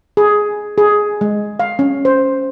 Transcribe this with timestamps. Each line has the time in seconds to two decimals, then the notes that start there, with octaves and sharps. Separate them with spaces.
0.17 G#4
0.78 G#4
1.21 G#3
1.60 F5
1.79 C#4
2.05 C5